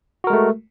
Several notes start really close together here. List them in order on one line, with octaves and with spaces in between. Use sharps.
F#4 A#4 G#3 A3